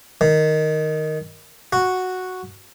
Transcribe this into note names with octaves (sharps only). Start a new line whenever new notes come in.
D#3
F#4